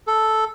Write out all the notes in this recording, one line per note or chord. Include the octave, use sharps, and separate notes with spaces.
A4